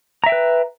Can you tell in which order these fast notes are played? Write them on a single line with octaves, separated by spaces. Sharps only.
A#5 E5 G5 B4